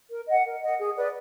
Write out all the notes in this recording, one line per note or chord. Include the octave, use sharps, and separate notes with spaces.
A#4
D#5 F#5
A#4
D#5 F#5
G#4
B4 D5